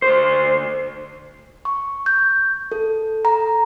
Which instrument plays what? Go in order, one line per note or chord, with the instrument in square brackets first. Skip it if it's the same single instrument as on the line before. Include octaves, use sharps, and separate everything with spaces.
[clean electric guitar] D2 C5
[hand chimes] C#6
G6
A4
A#5